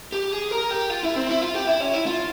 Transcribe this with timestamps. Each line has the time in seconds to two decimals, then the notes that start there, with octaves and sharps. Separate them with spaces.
0.12 G4
0.32 G#4
0.51 A#4
0.71 G4
0.90 F4
1.03 E4
1.16 C4
1.29 E4
1.42 F4
1.55 G4
1.67 E4
1.80 C#4
1.94 E4
2.06 F4